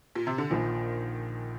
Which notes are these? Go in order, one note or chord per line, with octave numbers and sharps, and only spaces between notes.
A#2
C3
D3
A#1 A#2 D#3 F3